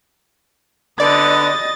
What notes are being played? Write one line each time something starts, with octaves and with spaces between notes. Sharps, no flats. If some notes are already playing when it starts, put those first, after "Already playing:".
D3 B3 D5 D#5 A6